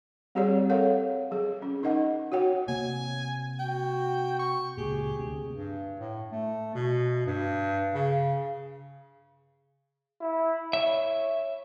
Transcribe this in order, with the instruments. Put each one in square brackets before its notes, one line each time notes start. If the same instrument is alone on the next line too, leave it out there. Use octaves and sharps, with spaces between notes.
[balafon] G3 C4 G4 G#4 C#5 D5
A4 A#4 C#5 F5 F#5
F#3 G#4
C#4
D#4 A#4 D#5 F#5
F#4 C#5 F#5 G5
[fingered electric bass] C3 A#3 C4 [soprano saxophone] G#5
[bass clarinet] F#4 [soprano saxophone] G5
[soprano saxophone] C#6
[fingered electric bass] C#2 A#2 [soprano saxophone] G4 [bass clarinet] G#4
[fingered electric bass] D2 C3
[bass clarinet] G2
A2
A3
B2
G2
C#3
[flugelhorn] E4
[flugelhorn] C#5 [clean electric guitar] E5